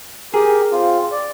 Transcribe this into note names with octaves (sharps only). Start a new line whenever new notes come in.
G4 G#4 A#4
C4 F4
D5